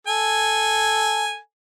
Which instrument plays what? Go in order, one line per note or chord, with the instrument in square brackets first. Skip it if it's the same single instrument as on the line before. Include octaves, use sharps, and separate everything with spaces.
[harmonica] A4 G#5